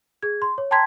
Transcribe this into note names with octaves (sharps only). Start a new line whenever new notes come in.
G#4 G#6
C6
C#5
G5 A5 A#5 C6 G#6 B6